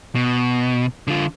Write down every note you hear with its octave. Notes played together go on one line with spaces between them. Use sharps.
B2
D3 F4